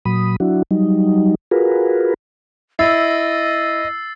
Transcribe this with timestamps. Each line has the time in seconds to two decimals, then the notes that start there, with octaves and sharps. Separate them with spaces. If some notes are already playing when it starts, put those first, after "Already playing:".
0.06 A#2 F#3 B5 D#6
0.40 F#3 D4 E4 F#4
0.71 F#3 G3 D#4
1.51 F4 F#4 G#4 A#4 B4
2.79 E4 D#5 E6 A6 C7